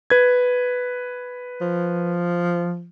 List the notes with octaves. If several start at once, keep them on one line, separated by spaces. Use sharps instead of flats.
B4 G#6
F3